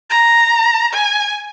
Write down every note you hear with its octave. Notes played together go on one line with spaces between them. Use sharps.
A#5
G#5